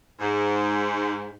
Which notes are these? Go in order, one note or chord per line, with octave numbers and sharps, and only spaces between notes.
G#2